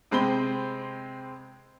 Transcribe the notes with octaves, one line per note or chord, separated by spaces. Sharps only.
C3 G#3 C4 B5 G7